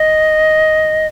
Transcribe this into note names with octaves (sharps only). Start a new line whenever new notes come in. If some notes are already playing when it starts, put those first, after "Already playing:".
Already playing: D#5